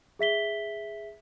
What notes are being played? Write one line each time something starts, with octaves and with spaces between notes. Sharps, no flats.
G#4 E5 B6 G7